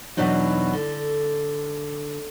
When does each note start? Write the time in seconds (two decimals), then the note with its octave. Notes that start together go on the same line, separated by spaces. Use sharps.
0.17 E2 B2 E3 F#3 D4 D#4
0.73 D3